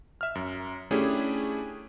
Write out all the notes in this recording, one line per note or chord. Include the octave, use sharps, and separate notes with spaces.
E5 F6
F#2
A3 C#4 D4 E4 G4 G#4